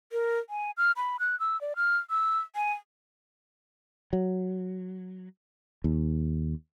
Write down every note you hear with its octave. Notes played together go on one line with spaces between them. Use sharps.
A#4
G#5
F6
B5
F#6
E6
D5
F6
E6
G#5
F#3
D#2